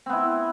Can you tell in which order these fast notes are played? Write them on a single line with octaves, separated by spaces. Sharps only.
C4 B3 E4